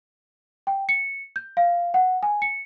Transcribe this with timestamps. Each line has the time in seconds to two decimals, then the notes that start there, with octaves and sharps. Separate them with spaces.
0.67 G5
0.89 C#7
1.36 G6
1.57 F5
1.94 F#5
2.23 G#5
2.42 C#7